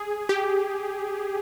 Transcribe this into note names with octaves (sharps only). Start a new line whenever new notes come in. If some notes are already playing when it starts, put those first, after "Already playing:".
Already playing: G#4
G4